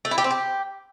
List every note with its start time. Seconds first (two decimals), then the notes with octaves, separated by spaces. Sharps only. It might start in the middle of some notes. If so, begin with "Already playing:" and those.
0.05 A3
0.11 E4
0.18 G4
0.24 C4
0.31 G4